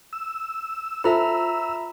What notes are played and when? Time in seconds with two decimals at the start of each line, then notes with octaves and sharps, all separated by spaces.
0.13 E6
1.04 F4 A4 C5 E5 A#5 B5